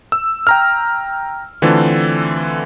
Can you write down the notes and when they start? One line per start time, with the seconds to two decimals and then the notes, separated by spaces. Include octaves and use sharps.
0.12 E6
0.47 G5 A#5 F6
1.62 D3 E3 A3 C4 F4 A4